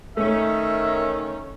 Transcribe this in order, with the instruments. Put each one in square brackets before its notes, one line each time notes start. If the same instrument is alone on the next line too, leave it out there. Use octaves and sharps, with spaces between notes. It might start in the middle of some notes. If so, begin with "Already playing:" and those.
[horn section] D#3 C#4 [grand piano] A3 [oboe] E5